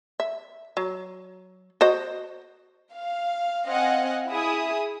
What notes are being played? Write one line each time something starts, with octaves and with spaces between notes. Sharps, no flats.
E5
F#3
F#4 C5 D#5
F5
C4 D#5 F5 F#5 G#5
E4 G#4 E5 D#6